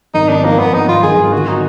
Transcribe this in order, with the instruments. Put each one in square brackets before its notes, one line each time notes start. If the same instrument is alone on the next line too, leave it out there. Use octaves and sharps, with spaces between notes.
[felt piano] G#1 [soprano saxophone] D#4
[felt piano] G#1 [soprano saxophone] D4
[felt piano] F3 [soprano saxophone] A#3
[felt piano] G#1 [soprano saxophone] B3
[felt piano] G#1 [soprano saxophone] D#4
[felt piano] G#1 [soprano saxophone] F4
[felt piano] G#1 [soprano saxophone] G#4
[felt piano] G#1
[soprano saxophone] F4
[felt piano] D3 [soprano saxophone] F#4
[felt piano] F#3 [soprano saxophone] D#4